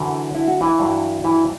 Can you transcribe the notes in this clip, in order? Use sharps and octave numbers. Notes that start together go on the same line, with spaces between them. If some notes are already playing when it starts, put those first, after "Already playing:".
Already playing: F#2 D3 E3 F#3 E4
E4
F#4
E3 E4
G2 F#3
E3 E4